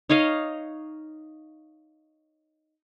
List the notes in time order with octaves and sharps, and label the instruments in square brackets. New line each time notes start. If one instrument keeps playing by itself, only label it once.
[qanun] D#4 C#5 D#5 F5